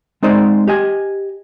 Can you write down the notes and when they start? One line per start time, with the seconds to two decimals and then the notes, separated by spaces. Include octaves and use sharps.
0.23 G#3 C4 D#4 C5 D5
0.68 G4 D#5 G#5